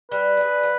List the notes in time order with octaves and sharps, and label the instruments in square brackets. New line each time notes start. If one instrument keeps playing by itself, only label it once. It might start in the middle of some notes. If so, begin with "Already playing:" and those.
[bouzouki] G3 [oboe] B4
[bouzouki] D4 G#4
F3